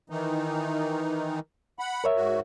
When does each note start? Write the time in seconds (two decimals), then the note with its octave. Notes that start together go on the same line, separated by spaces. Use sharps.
0.10 D#3 E3 D#4
1.79 F#5 B5
2.04 A#4 C#5 E5
2.16 G#2 F#4